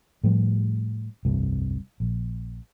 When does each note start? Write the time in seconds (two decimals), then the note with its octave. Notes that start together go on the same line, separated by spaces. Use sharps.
0.24 A2 F3 G3
1.25 F1 C2 G2 C3
2.00 A#1